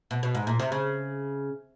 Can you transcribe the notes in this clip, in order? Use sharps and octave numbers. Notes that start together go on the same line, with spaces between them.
B2
B2
G#2
A#2
C3
C#3